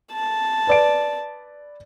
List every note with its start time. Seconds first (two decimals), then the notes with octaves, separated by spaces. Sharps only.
0.13 A5
0.67 B4 D5 D7